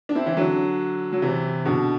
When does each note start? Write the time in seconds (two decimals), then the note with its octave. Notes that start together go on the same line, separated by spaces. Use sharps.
0.09 D4
0.15 C4 E4
0.26 E3
0.37 D3 F#3
1.12 F#3
1.22 C3 E3
1.65 B2 D3